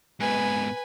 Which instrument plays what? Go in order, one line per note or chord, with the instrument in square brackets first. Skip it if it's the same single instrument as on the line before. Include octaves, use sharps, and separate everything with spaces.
[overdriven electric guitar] G#2 B2 [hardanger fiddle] B4 G#5